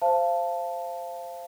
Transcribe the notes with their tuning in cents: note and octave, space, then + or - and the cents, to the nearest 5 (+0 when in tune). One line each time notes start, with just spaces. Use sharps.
C5 +0 F5 -25 A5 +0